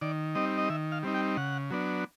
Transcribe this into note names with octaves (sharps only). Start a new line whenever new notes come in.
D#3 D5
G3 C4 D#4 D#5
D#5
D#3 E5
F5
G3 C4 D#4
G5
C#3 F#5
F#3 B3 D4